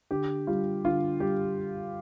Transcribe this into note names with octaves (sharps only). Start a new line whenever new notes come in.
D3 G4
G3 F4
D3 F4
G3 G4